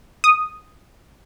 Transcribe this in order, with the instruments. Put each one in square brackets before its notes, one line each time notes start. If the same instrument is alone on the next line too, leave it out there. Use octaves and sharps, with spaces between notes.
[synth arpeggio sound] D#6